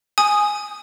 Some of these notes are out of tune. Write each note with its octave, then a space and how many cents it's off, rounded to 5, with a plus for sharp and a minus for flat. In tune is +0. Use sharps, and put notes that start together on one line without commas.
G#5 +0 D#6 +0